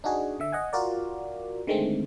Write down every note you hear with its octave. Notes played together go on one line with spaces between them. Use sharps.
D4 D#4 F#4 G#4
D3 E5
D#5 F#5 G#5
F4 F#4 A#4 D5
D3 D#3 G#3 A3 C4